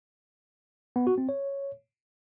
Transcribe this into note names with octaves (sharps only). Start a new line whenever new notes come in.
B3
F#4
C4
C#5